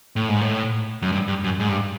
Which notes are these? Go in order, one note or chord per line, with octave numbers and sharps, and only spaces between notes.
A2
G#2
A2
F#2
G2
G2
F#2
G#2
G2